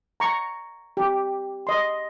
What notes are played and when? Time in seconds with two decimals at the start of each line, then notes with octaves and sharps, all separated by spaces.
0.20 A#5 C#6
0.97 G4
1.67 D#5 C6